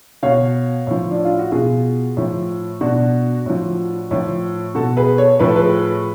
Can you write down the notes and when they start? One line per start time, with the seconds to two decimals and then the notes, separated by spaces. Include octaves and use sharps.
0.23 B2 C#5 F5
0.87 A2 F3
1.11 D4
1.25 F4
1.39 F#4
1.52 B2 F4 G#4
2.17 A2 F3
2.81 B2 D4 F#4
3.46 A2 F3
4.11 A2 F3
4.75 B2 F#4 A4
4.97 G#4 B4
5.18 A4 C#5
5.39 A2 F3 B4
5.48 A4
5.56 G#4 B4